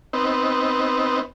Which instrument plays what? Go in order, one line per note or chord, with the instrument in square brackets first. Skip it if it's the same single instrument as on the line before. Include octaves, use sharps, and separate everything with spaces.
[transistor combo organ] B3 C4 D#4